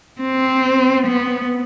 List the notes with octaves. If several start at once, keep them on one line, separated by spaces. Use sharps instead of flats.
C4
B3